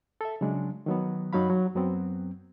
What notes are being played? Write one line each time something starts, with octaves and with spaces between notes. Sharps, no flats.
A4 E5
C#3 F#3 G#3 D4
D#3 F#3 B3
F#2 F#3 D#4 F5 B5
F#3
F#2 F#3 B3 C4